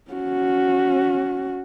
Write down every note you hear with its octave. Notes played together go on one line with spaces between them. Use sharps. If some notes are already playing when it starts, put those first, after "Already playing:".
C#4 F#4